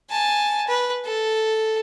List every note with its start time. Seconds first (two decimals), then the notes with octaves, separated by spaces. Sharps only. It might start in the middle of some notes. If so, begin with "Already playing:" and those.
0.10 G#5 A5
0.68 B4
1.05 A4